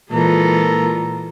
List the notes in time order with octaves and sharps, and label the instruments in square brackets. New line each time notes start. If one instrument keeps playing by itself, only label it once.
[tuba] A#2 [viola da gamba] E3 G#3 F4 [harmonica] A4 A#5